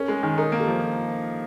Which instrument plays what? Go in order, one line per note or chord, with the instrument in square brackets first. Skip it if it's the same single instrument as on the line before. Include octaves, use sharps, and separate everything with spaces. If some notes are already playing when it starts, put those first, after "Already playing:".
Already playing: [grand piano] C#4 [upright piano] G#4 A#4
[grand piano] G#3
D#3
[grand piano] D#4 [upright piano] G#4 A#4
[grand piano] A#3
[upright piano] G4 A4
[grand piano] F3